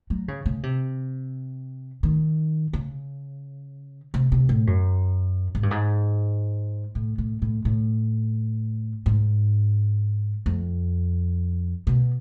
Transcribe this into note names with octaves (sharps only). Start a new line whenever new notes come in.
F#3
C#3
C#3
C3
D#3
C#3
C3
C3
A2
F#2
G#2
G2
G#2
A2
A2
A2
A2
G#2
F2
B2